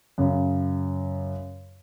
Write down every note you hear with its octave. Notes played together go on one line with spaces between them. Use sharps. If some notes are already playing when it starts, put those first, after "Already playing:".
F#2 C#3